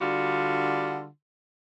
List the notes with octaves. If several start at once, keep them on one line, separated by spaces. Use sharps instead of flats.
D3 G3 F4 F#4